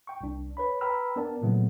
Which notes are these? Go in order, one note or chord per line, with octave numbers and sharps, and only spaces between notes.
G5 C#6
C2 D4
B4 C#5 B5
B4 G5 A#5 B5 E6 F6
B3 D4 A#4 D5 A5
A#2 C#3 F#3 A3 B3